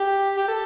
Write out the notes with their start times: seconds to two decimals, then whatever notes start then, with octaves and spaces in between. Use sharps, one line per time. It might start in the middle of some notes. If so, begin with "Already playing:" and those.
Already playing: G4
0.37 G4
0.48 A4